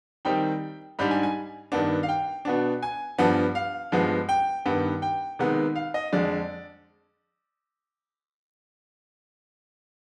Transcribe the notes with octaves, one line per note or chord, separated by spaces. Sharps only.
D#3 G3 C4 D#4 G5
G#2 G3 D4 B5
G#5
G#5
G2 D#3 B3 D4
F5
G5
B2 B3 D4
G#5
G2 F3 B3 D4
F5
G2 F3 G#3 B3
G5
G2 D#3 B3
G5
C3 D#3 G#3 B3 D#4
F5
D#5
F2 D3 G#3 D5